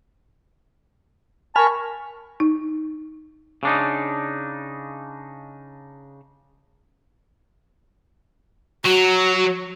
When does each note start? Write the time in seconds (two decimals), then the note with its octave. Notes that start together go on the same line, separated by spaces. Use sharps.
1.56 A#4 G#5 A5 B5 C#6 F6
2.40 D#4
3.63 C#3 D4 D#4
8.85 F#3 F#4